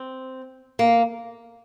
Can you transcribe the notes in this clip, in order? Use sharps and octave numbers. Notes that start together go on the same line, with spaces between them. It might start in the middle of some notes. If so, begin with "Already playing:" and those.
Already playing: C4
A#3